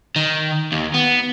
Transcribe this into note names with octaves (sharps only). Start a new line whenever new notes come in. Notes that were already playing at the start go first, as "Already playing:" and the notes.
D#3
D#2
B3